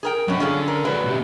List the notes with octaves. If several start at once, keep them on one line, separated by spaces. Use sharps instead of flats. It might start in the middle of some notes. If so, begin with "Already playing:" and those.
G#4 A#4 G5
B2 F#3 C#4 A#4
D3 C#4 F4 G#4 A4
A#4
F#3 G#3 B4 D5
B2 G4